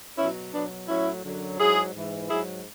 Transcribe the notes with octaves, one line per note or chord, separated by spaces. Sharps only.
B2 F#3 C#4 E4
B2 F#3 B3 D4
A2 F#3 C#4 E4
F#2 D3 F#3
G#2 F#3 E4 G#4
G#2 E3
G#2 F#3 E4 G#4